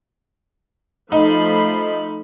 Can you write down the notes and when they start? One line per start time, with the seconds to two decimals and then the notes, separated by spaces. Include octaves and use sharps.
1.12 F3 A3 D#4 B5